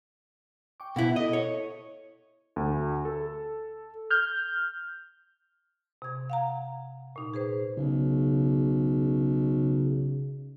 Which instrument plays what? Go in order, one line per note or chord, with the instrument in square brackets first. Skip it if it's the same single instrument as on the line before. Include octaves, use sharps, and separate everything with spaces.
[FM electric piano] G5 C#6 D6
[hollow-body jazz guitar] B2 E4 [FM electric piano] B3 F#5
[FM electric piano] E4 A4 [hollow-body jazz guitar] D#5
[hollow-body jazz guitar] C#5
[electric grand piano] D2
A4
[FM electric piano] F6 G6
[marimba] C3 G#6
F5 F#5 A#5
A#2 D#4
G#4 B4 C5
[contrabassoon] B1 [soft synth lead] C#3